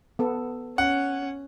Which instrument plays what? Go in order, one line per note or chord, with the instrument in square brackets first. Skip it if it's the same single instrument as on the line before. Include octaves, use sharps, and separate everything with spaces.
[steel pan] B3 A4
[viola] C#4 [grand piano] F#5